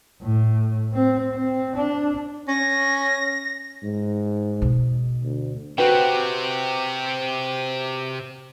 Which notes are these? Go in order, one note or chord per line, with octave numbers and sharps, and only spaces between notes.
A2
C4
C4
D4
C#4 A#6
G#2
B2
D2
C3 C4 F#4 B4 G5